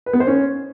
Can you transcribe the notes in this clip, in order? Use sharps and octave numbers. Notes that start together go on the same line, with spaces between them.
B4
B3
C5
C#4